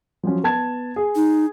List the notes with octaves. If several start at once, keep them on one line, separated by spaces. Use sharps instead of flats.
F3 F#3 C#4
B3 A5 G#6
G#4
D#4